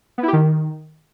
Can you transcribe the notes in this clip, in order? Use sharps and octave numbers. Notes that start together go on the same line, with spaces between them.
B3
E4
G4
D#3